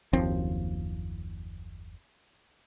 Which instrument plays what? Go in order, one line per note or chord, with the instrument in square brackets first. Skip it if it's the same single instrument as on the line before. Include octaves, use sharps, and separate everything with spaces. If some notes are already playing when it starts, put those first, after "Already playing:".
[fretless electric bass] F#1 D#2 F3 C4